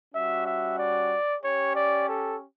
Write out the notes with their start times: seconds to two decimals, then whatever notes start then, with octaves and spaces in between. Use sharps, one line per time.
0.14 G3 C#4 F#4 E5
0.46 E5
0.78 D5
1.42 C#4 G4 C#5
1.74 D5
2.06 A4